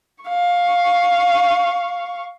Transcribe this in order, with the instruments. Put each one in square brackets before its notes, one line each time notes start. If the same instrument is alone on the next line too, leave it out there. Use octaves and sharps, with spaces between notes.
[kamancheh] F5 C#6